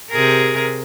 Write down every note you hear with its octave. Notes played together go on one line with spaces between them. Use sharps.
C3 G#4 A#4